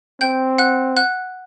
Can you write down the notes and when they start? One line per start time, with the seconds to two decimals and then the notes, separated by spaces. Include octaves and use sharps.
0.21 C4 G5 G6
0.58 F#5 F#6
0.97 F#5 F#6